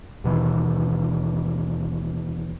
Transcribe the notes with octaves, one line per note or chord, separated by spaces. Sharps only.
D#2 B2 D#3 E3